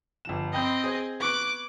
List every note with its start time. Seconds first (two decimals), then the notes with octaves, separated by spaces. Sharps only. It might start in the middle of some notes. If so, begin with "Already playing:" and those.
0.25 G1 F3 E7
0.53 C4 D#5 G5 B5 G6
0.84 G#4 C5 G#6
1.20 B3 C#6 D6 F#6